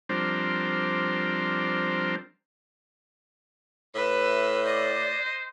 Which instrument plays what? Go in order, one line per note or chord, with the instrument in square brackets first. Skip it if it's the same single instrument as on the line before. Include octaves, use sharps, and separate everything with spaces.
[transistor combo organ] F3 G3 C4 D4 A#4 C5
[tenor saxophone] A2 [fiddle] B4 E5
[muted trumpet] C5 [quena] D5 [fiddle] D#5